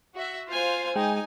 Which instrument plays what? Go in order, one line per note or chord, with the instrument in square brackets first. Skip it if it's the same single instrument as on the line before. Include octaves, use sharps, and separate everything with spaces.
[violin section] F#4 E5
[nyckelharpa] F4 G#5 [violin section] C5 F5
[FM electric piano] G#3 G5 [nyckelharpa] D#4 [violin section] G#5